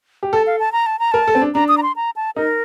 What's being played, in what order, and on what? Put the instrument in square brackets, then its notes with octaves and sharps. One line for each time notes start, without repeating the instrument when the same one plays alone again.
[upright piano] G4
[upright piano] A4 [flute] A5
[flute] F5
A5
A#5
A5
A#5
[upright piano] A#4 [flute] A5
[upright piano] A4
C4
D4
[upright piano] D4 [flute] A#5
[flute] D#6
A#5
C6
A#5
A5
[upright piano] D#4 [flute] A#4